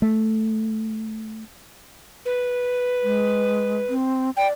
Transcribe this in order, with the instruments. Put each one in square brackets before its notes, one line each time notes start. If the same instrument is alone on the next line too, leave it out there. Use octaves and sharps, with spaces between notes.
[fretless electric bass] A3
[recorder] B4
[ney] G#3
C4
[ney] D5 [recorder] G5